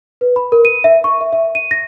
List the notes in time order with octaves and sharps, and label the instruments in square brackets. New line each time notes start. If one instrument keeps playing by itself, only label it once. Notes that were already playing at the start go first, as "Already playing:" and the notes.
[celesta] B4
B5
A#4
D#7
E5
C#6
E5
E5
D#7
A#6